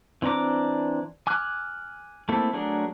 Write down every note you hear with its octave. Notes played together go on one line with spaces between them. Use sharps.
E3 C4 D4 A#5 D6
G#5 D6 F6 F#6
A3 A#3 C4 E4 A4
F#3 A3 D4 G#4 A#4